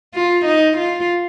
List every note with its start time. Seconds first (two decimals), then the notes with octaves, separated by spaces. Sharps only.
0.14 F4
0.45 D#4
0.77 F4